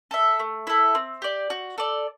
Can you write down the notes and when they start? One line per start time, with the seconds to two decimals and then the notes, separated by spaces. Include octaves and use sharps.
0.11 A4 E5
0.39 A3
0.67 E4 A4
0.95 C4
1.22 G4 D5
1.50 F#4
1.78 A4 D5